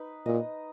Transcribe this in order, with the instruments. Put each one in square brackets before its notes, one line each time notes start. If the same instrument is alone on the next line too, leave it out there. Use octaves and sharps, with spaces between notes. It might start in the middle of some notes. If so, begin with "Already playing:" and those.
Already playing: [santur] D#4 B4
[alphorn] A#2 [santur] D#5